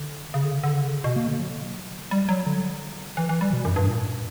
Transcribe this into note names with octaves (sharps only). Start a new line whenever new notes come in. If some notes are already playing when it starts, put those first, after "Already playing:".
Already playing: D3
C#3
D3
C#3
D3
C#3
B2
A#3
D3
F#3
G3
F#3
D3
E3
E3
G3
B2
F#2
G2
A#2